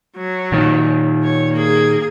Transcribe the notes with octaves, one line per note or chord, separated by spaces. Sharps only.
F#3
A#2 D#3
C#5
A#3 G#4